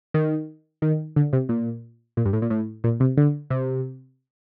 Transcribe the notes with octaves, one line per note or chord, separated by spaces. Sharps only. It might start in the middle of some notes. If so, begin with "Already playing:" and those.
D#3
D#3
D3
C3
A#2
A#2
G2
A2
A#2
A2
A#2
C3
D3
C3